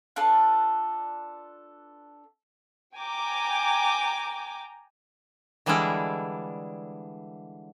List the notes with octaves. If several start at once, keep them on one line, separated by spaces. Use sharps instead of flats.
D4 F4 A4 B4
G5 G#5 A#5 D6
D3 E3 G3 G#3 D4 E4